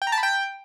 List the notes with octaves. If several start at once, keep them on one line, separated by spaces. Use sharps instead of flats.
G5
A#5
A5
B5
G5